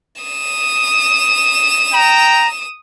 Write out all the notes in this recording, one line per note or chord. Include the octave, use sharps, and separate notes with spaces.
D#6 E7
G5 A#5